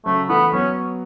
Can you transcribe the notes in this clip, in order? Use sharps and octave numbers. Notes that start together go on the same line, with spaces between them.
C#3 F#3 A3
E3 A3 B3
F#3 B3 C#4